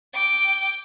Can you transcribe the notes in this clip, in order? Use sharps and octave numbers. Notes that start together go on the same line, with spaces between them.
G5 D6